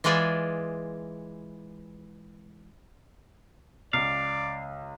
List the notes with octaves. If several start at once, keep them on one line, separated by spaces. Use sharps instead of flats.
E3 G#3 F4 G#4 D5 E5
C#2 D5 F5